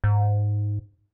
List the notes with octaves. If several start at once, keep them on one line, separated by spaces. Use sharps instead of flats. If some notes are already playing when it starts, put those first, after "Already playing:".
G#2